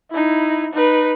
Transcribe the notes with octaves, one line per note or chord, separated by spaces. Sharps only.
D#4 E4
D#4 B4